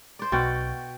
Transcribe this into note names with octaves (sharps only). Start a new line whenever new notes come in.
C5 D5
B1 B2 F#4 G5 A6